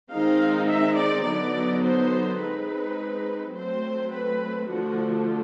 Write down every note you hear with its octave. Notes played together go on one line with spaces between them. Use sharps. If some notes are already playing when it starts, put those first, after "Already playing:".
D#3 G#3 C4 D#4 F5
E5
D5
D3 F#3 B3 D#4 D5
C5
G#3 C4 D#4 B4
F#3 A3 C4 C5
B4
D3 F3 A3 F#4